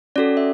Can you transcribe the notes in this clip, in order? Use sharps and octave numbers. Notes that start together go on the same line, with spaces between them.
C#4 F#4 A4 D5
E5